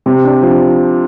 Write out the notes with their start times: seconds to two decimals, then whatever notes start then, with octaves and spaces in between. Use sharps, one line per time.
0.06 C3
0.24 D4
0.43 F3